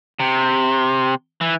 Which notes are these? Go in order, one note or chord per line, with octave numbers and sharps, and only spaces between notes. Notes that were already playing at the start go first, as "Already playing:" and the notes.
C3
E3